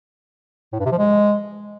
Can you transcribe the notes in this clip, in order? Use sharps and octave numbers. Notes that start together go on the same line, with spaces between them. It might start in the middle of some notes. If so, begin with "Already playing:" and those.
A2
G2
C3
F3
G#3